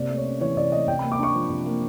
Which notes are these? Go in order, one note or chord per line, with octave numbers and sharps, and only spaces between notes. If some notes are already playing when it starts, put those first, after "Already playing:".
Already playing: C3 A#3 D5
A3
C#5
C#4
E3 C#5
C3 D5
A3 D#5
C3 G5
A#3 B5
D6
D4 C#6
F3
C3
A#3